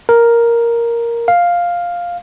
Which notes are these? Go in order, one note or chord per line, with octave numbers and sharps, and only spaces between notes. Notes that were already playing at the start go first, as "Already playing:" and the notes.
A#4
F5